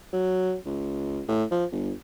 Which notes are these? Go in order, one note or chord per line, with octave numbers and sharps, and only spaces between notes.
F#3
C#2
A2
F3
G1